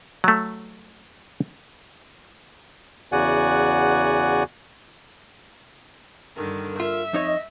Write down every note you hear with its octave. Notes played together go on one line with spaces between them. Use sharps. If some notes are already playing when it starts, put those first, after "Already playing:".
F#3 A3
E2 C#3 F#4 D5 F#5 G#5
G2 D3 D#3
F4 A#4 E5
F2 D#4 C#5 D#5